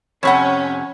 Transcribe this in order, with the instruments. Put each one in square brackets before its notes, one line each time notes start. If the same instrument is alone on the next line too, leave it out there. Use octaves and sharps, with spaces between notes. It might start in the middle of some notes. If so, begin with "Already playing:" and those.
[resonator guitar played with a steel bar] F2 C3 F#5 [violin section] C#4 [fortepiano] C#5 B5